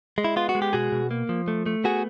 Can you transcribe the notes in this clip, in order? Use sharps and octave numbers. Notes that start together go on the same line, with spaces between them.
G#3
E4
B3 F4
F#4
G#3
G4
B2 F#4 G#4
B2
A#3
F3
A3
A3
B3 F#4 G#4